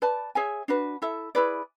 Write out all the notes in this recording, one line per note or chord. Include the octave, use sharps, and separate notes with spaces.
B4 D5 A5
G#4 C#5 E5 G#5
D4 F#4 B4
E4 A4 E5
E4 G#4 B4 D5